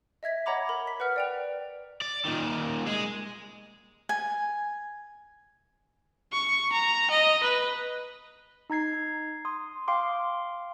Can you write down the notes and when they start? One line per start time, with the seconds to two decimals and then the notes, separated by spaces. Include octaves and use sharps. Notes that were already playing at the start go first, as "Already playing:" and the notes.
0.23 D#5 E5 G#6 B6
0.46 C#5 D#5 F#5 A#5 B5 D6
0.69 A#4 B5
0.87 B6
1.00 B4 F#5 F6
1.16 D5 G5 F7
2.01 D5
2.25 A#2 D#3
2.87 G#3 G#4
4.09 G#5
6.33 C#6
6.72 A#5
7.11 D#5
7.44 B4
8.70 D#4 A#5 G#6 C7
9.45 C6 D#6
9.88 F5 G5 C6 D6